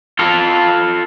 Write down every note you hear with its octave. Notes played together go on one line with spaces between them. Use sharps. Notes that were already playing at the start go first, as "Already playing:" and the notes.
F4 A4